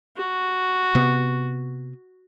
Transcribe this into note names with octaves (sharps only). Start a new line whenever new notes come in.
F#4
C3 B3